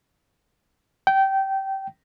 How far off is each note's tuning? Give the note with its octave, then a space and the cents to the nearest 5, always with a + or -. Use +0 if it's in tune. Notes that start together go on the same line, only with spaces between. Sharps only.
G5 -20